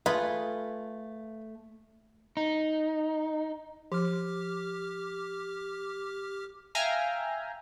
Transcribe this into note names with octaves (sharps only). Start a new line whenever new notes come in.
A3 F4 G#4 B4
D#4
F3 G4 D6 F6
E5 F5 G5 G#5 A#5 F6